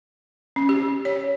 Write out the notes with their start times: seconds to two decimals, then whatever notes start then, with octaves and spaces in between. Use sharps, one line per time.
0.56 C#4
0.69 G4
1.05 C#5